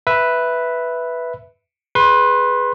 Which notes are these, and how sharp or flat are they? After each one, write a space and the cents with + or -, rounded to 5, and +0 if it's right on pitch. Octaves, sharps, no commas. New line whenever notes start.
B4 +0 E5 +0
G#4 +0 B4 +0 C6 +30